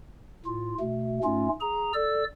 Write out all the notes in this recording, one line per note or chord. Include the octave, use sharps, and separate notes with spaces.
A2 F4
B2 A3
G#2 A3 C#4 F4
G#4 A#5
A4 D5 E6